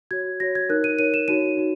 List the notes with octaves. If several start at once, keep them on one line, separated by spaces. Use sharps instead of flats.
F#4 C#5 G#6
F#4 C#5 A#6
G#6
D#4 A#4 C#5 F#6
D#7
D#4 A#4 C#5 D#7
E7
D#4 F#4 C#5 D#7
D#4 F#4